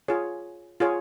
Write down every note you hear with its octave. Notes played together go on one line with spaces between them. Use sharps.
F4 G#4 C#5
F4 G#4 C#5